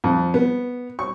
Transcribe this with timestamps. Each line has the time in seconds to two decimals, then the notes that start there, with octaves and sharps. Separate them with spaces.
0.04 F2
0.34 B3
0.99 C#6